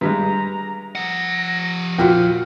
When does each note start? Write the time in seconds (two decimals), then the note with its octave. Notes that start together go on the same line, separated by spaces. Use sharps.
0.01 G2 G3 G#3 A#5
0.95 F3 F#5 A#6
1.99 A#2 F4 F#4 G5 F6